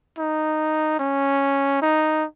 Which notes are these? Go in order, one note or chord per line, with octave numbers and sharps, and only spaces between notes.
D#4
C#4
D#4